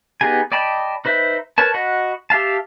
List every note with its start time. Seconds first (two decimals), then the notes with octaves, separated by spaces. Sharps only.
0.21 B3 D#4 G4 G#4 G#5
0.52 D5 D#5 G5 A5 B5
1.05 D#4 B4 C5 E5
1.58 A#4 B4 C#5 A5
1.74 F#4 D#5 F#5 B5
2.30 G4 E5 F5 A5